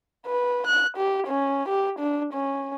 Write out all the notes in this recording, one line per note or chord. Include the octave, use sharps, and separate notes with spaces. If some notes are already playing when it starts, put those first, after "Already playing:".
B4
F#6
G4
C#4
G4
D4
C#4